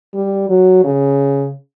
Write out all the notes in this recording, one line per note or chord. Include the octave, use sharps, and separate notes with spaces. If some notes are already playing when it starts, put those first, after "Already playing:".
G3
F#3
C#3